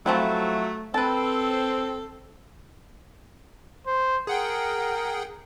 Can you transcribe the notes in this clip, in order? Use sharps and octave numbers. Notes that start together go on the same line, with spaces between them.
F3 F#3 A3 C4 E4
C4 A4 B4 A5
C5
G#4 A#4 F#5 G5